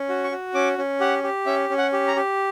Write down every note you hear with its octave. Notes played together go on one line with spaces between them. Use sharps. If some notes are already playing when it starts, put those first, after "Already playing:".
Already playing: C#4
F#4
C#6
F#4
C#4 D6
C#4
G4 F#5
G4
C#4 E5
C#4
F#5
G4
A#5
G4